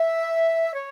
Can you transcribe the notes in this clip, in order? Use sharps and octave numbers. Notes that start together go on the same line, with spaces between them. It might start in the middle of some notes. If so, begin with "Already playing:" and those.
Already playing: E5
C#5